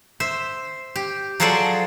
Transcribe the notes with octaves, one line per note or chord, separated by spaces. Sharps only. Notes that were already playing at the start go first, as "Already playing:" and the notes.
C5 E5
G4
F3 F#3 G#4 A4 C5 D5